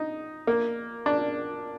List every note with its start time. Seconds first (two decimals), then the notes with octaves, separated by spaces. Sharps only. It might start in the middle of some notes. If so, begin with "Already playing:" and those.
Already playing: D#4
0.47 A#3
1.06 D4